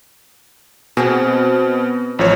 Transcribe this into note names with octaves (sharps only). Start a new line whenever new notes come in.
B2 B3 C4 G#4
A1 F3 C#5